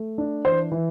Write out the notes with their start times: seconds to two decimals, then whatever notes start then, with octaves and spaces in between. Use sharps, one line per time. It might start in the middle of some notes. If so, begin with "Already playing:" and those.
Already playing: A3
0.18 D4
0.45 E3 C5
0.72 E3